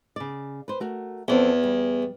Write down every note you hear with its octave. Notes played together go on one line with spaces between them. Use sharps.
C#3 D5
B4 C5
A3 F#4 A#4
E2 F3 C4 A4
G3